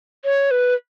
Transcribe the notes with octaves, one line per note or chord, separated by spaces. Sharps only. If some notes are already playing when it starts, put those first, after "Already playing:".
C#5
B4